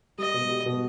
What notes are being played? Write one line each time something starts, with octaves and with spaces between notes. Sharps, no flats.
G3 D#5
B2
G3
B2